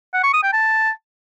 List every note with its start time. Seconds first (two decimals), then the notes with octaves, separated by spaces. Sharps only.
0.13 F#5
0.23 C#6
0.33 D#6
0.43 G5
0.53 A5